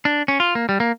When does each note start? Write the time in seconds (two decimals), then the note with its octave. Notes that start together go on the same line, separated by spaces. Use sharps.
0.05 D4
0.28 C#4
0.40 F4
0.55 A#3
0.69 G3
0.80 A#3